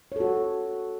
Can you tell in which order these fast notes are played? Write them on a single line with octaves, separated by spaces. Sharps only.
C#5 A4 F#4